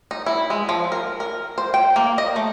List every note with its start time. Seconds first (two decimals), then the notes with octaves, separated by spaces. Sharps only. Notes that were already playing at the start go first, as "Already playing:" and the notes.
0.11 D#4
0.26 E4
0.50 G#3
0.69 F3
0.92 A#4
1.20 A#4
1.58 C5
1.74 G5
1.96 A#3
2.18 D#5
2.36 A3